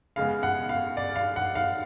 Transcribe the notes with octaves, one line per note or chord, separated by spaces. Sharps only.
C#3 G#3 B3 F5
F#5
F5
D5
F5
F#5
F5